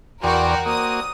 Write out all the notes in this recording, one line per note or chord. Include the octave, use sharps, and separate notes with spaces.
E2 F#4 A#4 D5 G5 C6
A#3 F#4 C5 D5 D#6